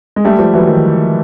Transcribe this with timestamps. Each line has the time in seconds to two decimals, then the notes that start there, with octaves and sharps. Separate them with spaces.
0.16 G#3
0.25 G3 A3
0.39 F3 G3
0.53 E3 F#3
0.67 D#3 F3